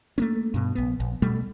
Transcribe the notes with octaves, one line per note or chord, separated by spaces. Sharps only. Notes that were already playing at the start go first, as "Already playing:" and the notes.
A3 A#3 C#4
G2 B2
A#1 B3
A#1
B2 G3 A3